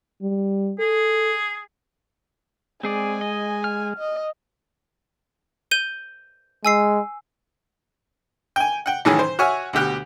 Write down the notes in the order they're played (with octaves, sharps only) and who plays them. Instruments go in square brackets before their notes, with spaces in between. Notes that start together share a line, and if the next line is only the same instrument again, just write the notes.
[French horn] G3
[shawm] G#4 [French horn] A4
[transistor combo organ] G#3 [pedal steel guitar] C4 G#4 D5 [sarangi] G#5
[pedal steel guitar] D#5
F6
[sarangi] D#5
[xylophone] G6 D#7 G7
[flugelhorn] G#3 [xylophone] G#5 E6 C7
[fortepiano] G5 G#5
F#5 G5
A2 D#3 E3 F#3 C#4 G#4
C5
F#4 C#5 E5 G#5 F6
D2 B2 G4 F#6